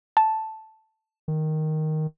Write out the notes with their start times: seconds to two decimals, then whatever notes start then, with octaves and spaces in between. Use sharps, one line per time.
0.17 A5
1.28 D#3